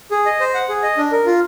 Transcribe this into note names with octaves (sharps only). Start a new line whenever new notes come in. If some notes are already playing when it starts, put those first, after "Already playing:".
G#4
D#5
C5
F#5
G#4
D#5
D4
A#4
F4